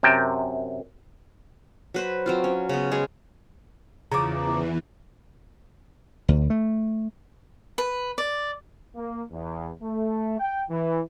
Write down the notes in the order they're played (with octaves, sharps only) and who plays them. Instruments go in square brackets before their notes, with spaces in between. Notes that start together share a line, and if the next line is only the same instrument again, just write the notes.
[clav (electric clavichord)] F#2 C3 A#4 G5 A5
[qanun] F#3 B4 C5
F#3 C4 F4
C#4
C#3 B3
G#3 G#4 C#5
[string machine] E2 E3 [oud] C#3 F3 [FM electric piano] A#5 D6
[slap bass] D2
A3
[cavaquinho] B4
D5
[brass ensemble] A#3
E2
A3
G5
E3